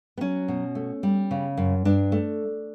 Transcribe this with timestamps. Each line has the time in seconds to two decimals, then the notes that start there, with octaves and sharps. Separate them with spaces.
0.17 B3
0.21 F#3 C#4
0.48 B2
0.75 A3
1.03 G3
1.31 C#3
1.57 F#2
1.85 G2 D4
2.12 A3